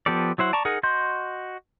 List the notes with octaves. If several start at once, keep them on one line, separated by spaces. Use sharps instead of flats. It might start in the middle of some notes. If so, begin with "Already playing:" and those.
F3 B3 G4 A4 D5
F#3 E4 C5 F#5
D5 A5 A#5 C#6
D#4 G#4 A#4 F#5
F#4 D#5 C6 G6